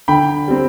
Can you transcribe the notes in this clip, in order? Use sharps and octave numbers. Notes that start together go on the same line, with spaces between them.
D3 G5 B5
G3 C4